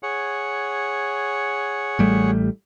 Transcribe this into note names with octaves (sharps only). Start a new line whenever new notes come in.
G#4 C#5 F#5
A1 G3 A3